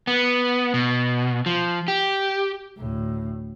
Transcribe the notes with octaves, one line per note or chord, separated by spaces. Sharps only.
B3
B2
F3
G4
D2 A2